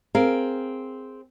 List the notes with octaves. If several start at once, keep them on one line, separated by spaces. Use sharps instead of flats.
C4 G#4 A#4 F5